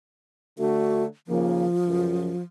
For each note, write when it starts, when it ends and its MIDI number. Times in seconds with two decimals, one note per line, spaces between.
0.59 1.04 50
0.59 1.04 57
0.59 1.03 66
1.27 1.64 39
1.27 1.64 49
1.27 2.43 53
1.27 1.64 58
1.86 2.31 37
1.86 2.31 42